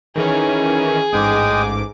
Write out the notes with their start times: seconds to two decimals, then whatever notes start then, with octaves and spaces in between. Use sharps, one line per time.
0.16 D#3 E3 C#4 G#4
1.13 A1 G#2 G#3 G5 D6 D#6